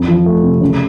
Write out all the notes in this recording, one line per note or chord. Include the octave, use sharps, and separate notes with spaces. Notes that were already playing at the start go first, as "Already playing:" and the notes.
Already playing: F2
F3
A3
C3
C#3